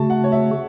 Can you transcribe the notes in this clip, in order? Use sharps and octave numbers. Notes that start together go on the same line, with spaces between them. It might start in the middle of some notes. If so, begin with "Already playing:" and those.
Already playing: C#3 A3 F#4 A5
F#5
C#5
E5